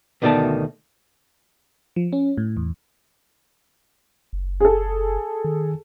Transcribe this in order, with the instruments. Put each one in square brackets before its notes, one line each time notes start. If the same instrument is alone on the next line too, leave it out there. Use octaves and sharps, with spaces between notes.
[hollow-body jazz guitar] D2 B2 D#3 A3 D5 A5
[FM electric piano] F3
C#4
A2
E2
[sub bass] F#1
[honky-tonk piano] G#4 A4
[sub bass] D#3